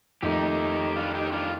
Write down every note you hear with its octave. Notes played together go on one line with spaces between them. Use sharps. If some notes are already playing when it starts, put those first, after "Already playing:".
F2 D#3 A3 D#4 G4
D4 F4
D#4 G4
D4 F4